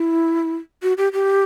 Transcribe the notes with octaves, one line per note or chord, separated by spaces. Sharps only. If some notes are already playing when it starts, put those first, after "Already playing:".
Already playing: E4
F#4
G4
G4